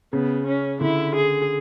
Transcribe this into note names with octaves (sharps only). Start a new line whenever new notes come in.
C#3 B3
C#4
D3 E4
G#4